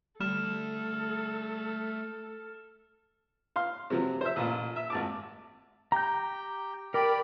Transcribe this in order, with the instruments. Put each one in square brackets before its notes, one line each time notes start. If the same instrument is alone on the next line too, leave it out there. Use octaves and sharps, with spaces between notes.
[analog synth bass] G3 [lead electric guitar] A3 D5 [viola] A4 [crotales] F6 E7
[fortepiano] F5 C6
C3 F3 F#3
C5 E5
A1 A#2
E5
G#1 A5 D6
[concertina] G4 G5 [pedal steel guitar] A#5 G6
[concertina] G4 D5 B5 [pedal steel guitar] A#4 [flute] G5